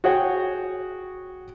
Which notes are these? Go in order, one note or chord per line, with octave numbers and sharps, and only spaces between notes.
F#4 G#4 C#5 F#5 G5